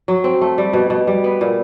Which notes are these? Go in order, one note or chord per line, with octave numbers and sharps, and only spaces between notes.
F#3
C4
A3
G3
B2
B2
G3
B3
A#2